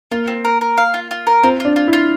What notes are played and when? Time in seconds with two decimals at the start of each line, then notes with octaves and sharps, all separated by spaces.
0.11 A#3 F4
0.28 C4
0.45 A#4
0.61 A#4
0.78 F5
0.94 F4
1.11 F4
1.27 A#4
1.43 C4 F4
1.60 D4 F4
1.76 F4
1.88 E4
1.93 F4